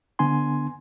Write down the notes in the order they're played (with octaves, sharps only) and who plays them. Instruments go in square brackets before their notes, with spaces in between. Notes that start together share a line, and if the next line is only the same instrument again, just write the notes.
[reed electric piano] D3 B3 D4 G#5 C6